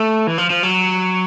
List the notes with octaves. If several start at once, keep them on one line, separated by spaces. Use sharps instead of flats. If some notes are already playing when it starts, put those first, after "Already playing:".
Already playing: A3
E3
F3
F3
F#3